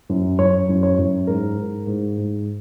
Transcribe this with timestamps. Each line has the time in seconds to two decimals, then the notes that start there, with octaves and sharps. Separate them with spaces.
0.09 F#2
0.38 F#2 C#5
0.69 F#2
0.83 C#5
0.99 F#2
1.27 G#2 A#4
1.58 G#2
1.87 G#2
2.18 G#2